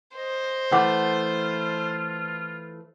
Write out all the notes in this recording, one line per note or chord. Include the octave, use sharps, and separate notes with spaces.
C5 D#5
E3 A3 F4 F#5 D6